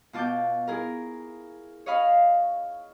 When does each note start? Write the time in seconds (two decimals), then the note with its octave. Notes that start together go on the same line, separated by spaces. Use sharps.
0.13 B2 F4 A5 D6 G6
0.67 E4 G#4 A#4
1.86 C#5 D#5 F5 B5